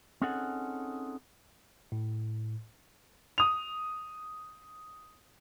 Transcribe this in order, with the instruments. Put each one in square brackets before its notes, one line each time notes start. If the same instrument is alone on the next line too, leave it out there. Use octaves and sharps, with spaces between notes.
[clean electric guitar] C4 C#4 D#4 G#4 A4 F#5
[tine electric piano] A2
[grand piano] D#6 F7